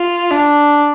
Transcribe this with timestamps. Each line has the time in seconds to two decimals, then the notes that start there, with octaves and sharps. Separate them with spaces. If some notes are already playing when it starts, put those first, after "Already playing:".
Already playing: F4
0.31 D4